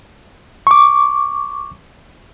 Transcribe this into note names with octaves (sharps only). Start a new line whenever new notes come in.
C#6 D6